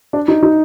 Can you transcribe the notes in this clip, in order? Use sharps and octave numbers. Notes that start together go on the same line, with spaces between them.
D4
D#4
D#4